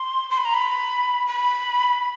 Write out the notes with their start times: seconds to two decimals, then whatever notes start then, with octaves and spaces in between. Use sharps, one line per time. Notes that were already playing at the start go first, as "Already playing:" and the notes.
Already playing: C6
0.30 C6
0.38 B5
0.45 A#5
0.54 B5
1.27 B5